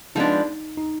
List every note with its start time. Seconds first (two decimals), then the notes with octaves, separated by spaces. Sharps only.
0.15 F3 G#3 B3 D4 D#4
0.77 D#4